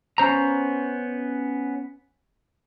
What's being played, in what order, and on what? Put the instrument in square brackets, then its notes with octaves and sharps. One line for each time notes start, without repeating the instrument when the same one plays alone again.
[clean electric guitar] B3 C#4 C5 A#5